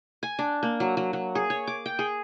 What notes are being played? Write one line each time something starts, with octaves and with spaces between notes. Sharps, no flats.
G#5
D4
A#3
F#3
F#3
F#3
G#4
C#5
D6
G5
G#4